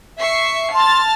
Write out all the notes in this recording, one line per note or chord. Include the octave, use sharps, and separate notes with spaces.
E5 C#6 C7
A5 C6 F6 A6